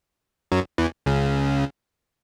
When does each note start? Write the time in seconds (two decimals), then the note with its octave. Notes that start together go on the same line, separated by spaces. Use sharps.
0.52 F#2 F#3
0.78 E2 E3
1.06 C#2 C#3